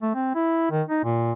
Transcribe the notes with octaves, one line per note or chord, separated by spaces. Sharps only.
A3
C4
E4
D#3
D#4
A#2